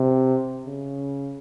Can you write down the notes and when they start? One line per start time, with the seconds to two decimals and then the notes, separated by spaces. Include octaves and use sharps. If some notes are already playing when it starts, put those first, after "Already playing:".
Already playing: C3
0.67 C#3